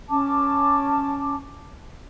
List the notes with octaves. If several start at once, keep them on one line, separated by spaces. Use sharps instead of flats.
C#4 A5 D6